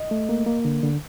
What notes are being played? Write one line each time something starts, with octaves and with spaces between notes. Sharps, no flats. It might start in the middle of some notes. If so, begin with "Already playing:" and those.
Already playing: D#5
A3
A#3
A#3
D3
D3